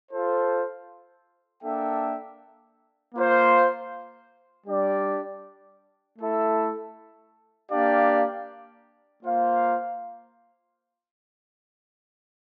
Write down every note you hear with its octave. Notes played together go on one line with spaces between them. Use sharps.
F4 A4 C5
A#3 D4 A4 E5 G5
A#3 F4 C5 F5
G3 D4 G4 D5
A3 E4 A4 E5
A#3 D4 G4 D5 F5
A#3 F4 C5 F5